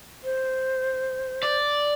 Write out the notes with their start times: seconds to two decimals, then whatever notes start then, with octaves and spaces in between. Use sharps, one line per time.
0.24 C5
1.43 D5